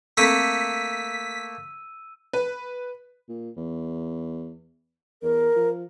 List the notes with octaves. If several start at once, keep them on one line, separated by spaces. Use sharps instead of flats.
A3 A#3 C4 A4 E6 B6 D#7
B4
A#2
E2
E2 A#4
F3